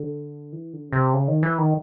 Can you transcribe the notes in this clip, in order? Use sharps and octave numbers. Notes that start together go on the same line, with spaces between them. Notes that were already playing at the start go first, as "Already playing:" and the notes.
Already playing: D3
E3
D3
C#3
C3
C#3
D#3
E3
D#3